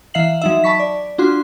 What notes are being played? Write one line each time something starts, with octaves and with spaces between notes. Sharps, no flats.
E3 E5 F5 C7 F#7
F#3 D#4 E5
A5 B5 C#6 B6
D5
D4 F4 F#4 C6